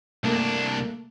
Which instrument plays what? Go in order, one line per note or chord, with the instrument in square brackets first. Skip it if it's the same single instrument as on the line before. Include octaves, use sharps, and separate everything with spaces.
[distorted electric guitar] C2 D4 [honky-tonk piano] A3 A#3